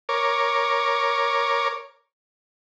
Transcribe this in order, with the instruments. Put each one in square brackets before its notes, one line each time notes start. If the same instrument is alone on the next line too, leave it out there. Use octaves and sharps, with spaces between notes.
[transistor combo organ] A#4 C#5 D6